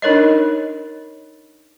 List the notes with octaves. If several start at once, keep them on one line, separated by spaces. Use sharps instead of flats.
D4 D#4 A#4 C#5 D#5